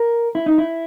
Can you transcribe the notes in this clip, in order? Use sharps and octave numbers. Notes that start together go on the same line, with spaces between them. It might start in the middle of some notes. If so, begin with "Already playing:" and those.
Already playing: A#4
E4
D#4
E4